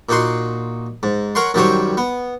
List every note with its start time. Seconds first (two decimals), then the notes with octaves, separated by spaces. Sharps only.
0.09 A#2 D#4 F#4 C6
1.03 G#2
1.35 A#4 C#5 F#5 C6
1.54 F#2 D#3 F#3 G3 C5 C#5
1.97 B3